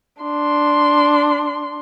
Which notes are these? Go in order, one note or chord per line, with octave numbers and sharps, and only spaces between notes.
D4 C6